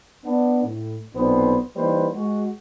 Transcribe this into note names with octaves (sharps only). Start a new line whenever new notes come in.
B3 D4
A2
B1 A#2 B3 C4 D4 C5
E3 G3 A#3 D#4 B4 C5
G#3 F#4